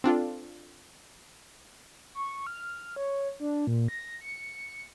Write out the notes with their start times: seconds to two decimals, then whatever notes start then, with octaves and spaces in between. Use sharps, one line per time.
0.04 C4 D4 F4 A4
2.15 C#6
2.47 F6
2.96 C#5
3.40 D4
3.67 A#2
3.88 A#6
4.21 C#7